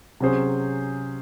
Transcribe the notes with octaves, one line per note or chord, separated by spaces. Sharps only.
C3 F#3 C#4 G#4 C5